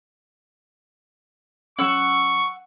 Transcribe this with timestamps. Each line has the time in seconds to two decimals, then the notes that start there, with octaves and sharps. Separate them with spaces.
1.79 F#3 C#4 F#5 C#6 E6